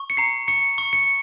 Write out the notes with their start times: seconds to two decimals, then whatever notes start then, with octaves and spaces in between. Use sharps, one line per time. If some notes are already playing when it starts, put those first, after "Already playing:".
Already playing: C#6
0.10 C#7
0.17 A#5 C7
0.48 C#6 C#7
0.78 C#6
0.93 C#7